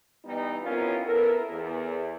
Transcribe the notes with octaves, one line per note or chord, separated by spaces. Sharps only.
E3 G3 B3 D#4
F2 B3 C#4 E4 F4 A#4
B3 E4 A4 A#4
E2